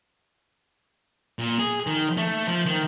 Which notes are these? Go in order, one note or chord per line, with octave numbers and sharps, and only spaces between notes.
A#2
G#4
D#3
A3
F3
D#3